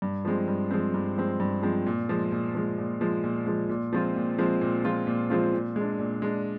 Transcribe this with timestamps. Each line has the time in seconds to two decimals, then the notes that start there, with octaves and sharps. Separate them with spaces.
0.02 G2
0.25 F3 G#3 C4
0.48 G2
0.71 F3 G#3 C4
0.94 G2
1.17 F3 G#3 C4
1.40 G2
1.63 F3 G#3 C4
1.86 A#2
2.09 F3 G#3
2.32 A#2
2.55 F3 G#3
2.78 A#2
3.01 F3 G#3
3.23 A#2
3.46 F3 G#3
3.69 A#2
3.93 F3 G#3 C4 F4
4.16 A#2
4.38 F3 G#3 C4 F4
4.61 A#2
4.84 F3 G#3 C4 F4
5.07 A#2
5.30 F3 G#3 C4 F4
5.53 A#2
5.76 G#3 D4
5.99 A#2
6.22 G#3 D4